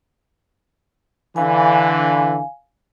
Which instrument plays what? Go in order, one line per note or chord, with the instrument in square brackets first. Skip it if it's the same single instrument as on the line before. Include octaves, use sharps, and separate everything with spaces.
[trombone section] D3 E3 [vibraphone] F5 G#5